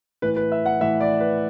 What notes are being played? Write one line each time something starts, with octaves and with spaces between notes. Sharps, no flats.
A2 E3 B4
B4
E5
F#5
A2 E3 E5
D5
B4